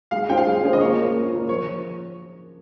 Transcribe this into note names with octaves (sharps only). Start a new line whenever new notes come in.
G#3 F5
C#4 F4 G#4 C5 G5
F5
G#3
C#4 F4 G#4 C5
D#5
A#3 C#5
F4 A#4
A#3
F4 A#4
F3 C#5